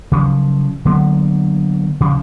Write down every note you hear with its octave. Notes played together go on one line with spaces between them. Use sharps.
C#3 F3 F#3
D3 F#3 A#3 B3
C#3 F3